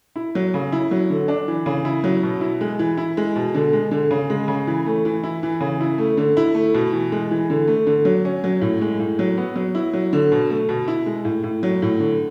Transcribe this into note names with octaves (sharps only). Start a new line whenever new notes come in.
E4
F#3
C#3
E4
F#3
D3
D4
E3
C#3
E4
F#3
B2
E4
G#3
E3
E4
G#3
B2
D3
G#3
D3
C#3
G#3
C#3
E3
A3
E3
E4
E3
C#3
E4
A3
D3
E4
A3
B2
E3
G#3
E3
D3
A3
D3
F#3
C#4
F#3
A2
G#3
A2
F#3
B3
F#3
E4
F#3
D3
B2
A3
B2
E4
G#3
A2
A2
F#3
A2
D3